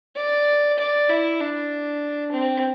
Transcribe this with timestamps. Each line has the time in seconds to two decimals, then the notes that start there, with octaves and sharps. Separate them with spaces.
0.16 D5
0.78 D5
1.09 E4
1.40 D4
2.32 C4